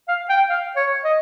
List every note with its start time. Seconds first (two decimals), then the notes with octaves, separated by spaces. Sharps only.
0.08 F5
0.29 G5
0.49 F5
0.76 C#5
1.04 D#5